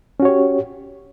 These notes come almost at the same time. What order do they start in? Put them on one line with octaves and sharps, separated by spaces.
C#4 F#4 C#5 G4